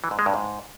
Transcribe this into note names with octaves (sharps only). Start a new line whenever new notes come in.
E3
G#2
G#3
G2
G#2